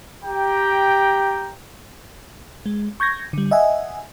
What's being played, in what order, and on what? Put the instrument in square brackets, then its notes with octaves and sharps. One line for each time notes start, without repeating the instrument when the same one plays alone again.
[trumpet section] G4 G5 A#5
[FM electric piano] G#3
C#6 G6 G#6 A#6
D3 G3
D#5 E5 F#5 G#5